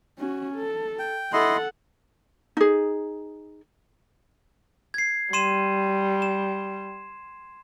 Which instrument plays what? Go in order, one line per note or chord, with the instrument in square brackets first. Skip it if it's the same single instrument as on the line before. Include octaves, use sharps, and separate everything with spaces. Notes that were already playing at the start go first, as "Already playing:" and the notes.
[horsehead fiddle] C#4 F#4
A4
[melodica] G5
[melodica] E4 D#5 C6 [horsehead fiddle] A4 F#5
[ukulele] D#4 G#4
[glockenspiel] G#6 C7
[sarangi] G3 [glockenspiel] C6 D#7 E7
[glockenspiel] E7